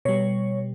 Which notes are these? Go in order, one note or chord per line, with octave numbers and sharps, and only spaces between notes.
B2 G3 C#5